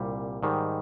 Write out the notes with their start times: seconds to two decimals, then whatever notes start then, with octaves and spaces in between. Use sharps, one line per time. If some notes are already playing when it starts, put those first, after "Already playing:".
Already playing: C2 A#2 G3
0.43 G#2 D#3 G3